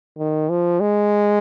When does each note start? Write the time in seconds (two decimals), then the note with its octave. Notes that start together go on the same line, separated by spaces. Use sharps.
0.18 D#3
0.50 F3
0.80 G#3